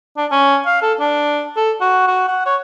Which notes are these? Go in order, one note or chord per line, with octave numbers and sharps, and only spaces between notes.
D4
C#4
F5
A4
D4
A4
F#4
F#4
F#5
C#5